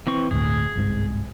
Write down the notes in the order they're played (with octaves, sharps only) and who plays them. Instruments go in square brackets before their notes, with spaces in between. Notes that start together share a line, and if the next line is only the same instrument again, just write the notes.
[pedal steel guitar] E3 C4 C#6
[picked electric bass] G1 D2 A2 [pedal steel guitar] G#4
[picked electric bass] G1 C2 G#2